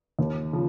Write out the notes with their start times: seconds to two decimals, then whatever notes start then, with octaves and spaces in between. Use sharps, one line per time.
0.19 D#2
0.53 C#3 F3